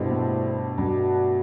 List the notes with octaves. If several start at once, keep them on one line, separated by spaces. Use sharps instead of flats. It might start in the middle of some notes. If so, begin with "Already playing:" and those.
Already playing: G2 B2 G3 B3 E4 A4 C5
A2
G2 B2 A3 D4 F#4